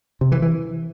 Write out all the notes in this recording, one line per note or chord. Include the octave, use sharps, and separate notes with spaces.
C3
E3
E3